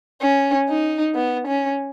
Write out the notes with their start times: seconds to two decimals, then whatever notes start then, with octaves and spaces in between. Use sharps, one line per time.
0.21 C#4
0.69 D#4
1.15 B3
1.47 C#4